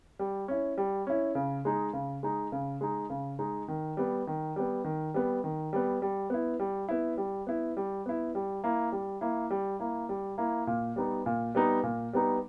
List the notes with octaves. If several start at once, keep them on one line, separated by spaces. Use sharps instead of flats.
G3
C#4 E4
G3
C#4 E4
C#3
G#3 D#4
C#3
G#3 D#4
C#3
G#3 D#4
C#3
G#3 D#4
D#3
G3 B3
D#3
G3 B3
D#3
G3 B3
D#3
G3 B3
G3
B3 E4
G3
B3 E4
G3
B3 E4
G3
B3 E4
G3
A#3 E4
G3
A#3 E4
G3
A#3 E4
G3
A#3 E4
A#2
G3 B3 D#4
A#2
G3 B3 D#4
A#2
G3 B3 D#4